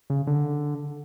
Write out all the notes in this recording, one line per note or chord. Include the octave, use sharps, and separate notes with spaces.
C#3
D3